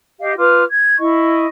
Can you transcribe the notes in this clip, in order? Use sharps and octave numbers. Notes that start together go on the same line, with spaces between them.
G4 D#5 F5
F4 B4 D6 F6
G#6
E4 D#5 C#6